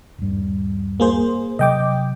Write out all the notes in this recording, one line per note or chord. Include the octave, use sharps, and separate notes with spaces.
D#1 G2
A#3 G#4 C5
C3 F#3 D#5 G5 D6